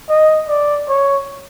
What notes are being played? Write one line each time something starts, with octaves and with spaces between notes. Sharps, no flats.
D#5
D5
C#5